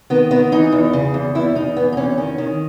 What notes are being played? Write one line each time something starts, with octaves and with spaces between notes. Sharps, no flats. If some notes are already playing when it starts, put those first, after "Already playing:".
D#3 B3
D#3 B3
E3 D#4
E2
C#3
E2
E2 E4
E2 D#4
E2 B3
D#4
E2 C#4
D#3 C#4
D#3